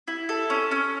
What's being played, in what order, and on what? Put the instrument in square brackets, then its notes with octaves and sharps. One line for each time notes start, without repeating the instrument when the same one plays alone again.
[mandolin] E4
A4
C#4
C#4